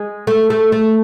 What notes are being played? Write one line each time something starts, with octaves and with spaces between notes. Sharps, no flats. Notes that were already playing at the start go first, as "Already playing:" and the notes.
Already playing: G#3
A3
A3
A3